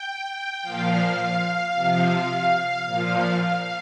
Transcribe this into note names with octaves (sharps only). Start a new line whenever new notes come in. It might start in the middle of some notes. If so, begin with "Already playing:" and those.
Already playing: G5
A#2 F3 F5
C3 F3
A#2 F3 F5
F5